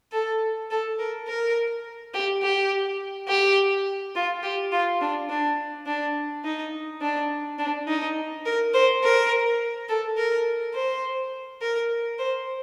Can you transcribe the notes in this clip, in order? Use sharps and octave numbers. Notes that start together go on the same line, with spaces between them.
A4
A4
A#4
A#4
G4
G4
G4
F4
G4
F4
D4
D4
D4
D#4
D4
D4
D#4
A#4
C5
A#4
A4
A#4
C5
A#4
C5